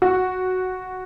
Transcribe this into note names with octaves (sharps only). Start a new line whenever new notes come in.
F#4